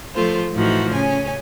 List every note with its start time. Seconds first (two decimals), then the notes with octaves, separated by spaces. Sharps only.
0.14 F3 A3 F4 C5
0.53 A2 E3 F3 D#4 F#4
0.93 C#3 C#4 G#5